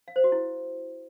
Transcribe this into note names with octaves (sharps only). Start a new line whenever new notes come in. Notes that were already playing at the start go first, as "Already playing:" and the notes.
F5
C5
F#4
E4